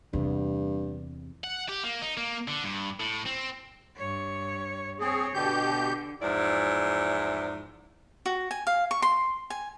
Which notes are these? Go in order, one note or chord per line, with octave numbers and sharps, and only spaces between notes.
E2 G2 C3
F#5
G4
A#3
D#4
A#3
D3
G2
A2
C4
G2 C#5
C4 G#4 C#5
B2 D3 G4 G6
E2 G#2 F3 E4 D5
F#4
G#5
F5
C#6
C6
G#5